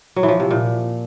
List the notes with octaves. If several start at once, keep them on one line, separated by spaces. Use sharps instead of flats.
F#3
E3
F3
C3
A#2